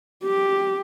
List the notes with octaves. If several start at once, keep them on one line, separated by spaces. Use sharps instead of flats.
G4